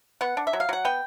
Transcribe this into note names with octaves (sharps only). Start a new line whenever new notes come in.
B3 F#5
D4
E5
F#3
F5
F#3 F#5
B3 G5